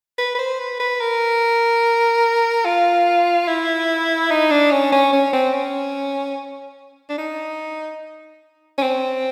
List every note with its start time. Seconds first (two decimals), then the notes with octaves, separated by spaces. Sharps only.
0.18 B4
0.35 B4
0.39 C5
0.59 B4
0.80 B4
1.01 A#4
2.65 F4
3.48 E4
4.31 D#4
4.51 D4
4.72 C#4
4.92 C#4
5.13 C#4
5.33 C4
5.54 C#4
7.09 D4
7.18 D#4
8.78 C#4
8.83 C4